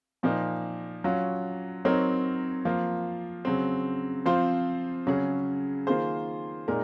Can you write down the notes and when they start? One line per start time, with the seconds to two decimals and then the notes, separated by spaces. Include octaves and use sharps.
0.23 A#2 F3 A#3 D#4
1.04 F#3 C#4 F4
1.85 F#3 C4 D#4 A#4 C#5
2.65 F3 A#3 F4
3.45 C#3 F#3 C4
4.26 F3 C4 F4 C5
5.07 C#3 F#3 C#4 G#4
5.87 D#3 A#3 F4 G#4 C5
6.68 A#2 G#3 D#4 A#4